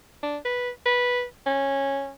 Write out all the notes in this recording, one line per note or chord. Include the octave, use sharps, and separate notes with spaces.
D4
B4
B4
C#4